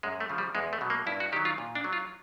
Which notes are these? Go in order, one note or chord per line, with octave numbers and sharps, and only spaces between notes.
F#2 G#3
A3
C#3 F3
G3
E2 G#3
A3
B2 F#3
A#3
G2 E4
F#4
D#3 F#3 G4
F4
A#2
D4
F#3
F4